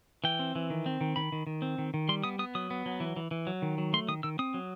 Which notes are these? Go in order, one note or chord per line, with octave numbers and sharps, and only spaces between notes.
E3 G5
C4
E3
D#3
C4
D#3
D#3 B5
D#3
D#3
C4
D#3
D#3
G3 C6
B3 D#6
B3 D#6
F#3 D#6
B3
F#3
E3
E3
E3
F#3
D#3
F#3
A3 C6
D#3 D#6
D#3 E6
C4 D#6
F#3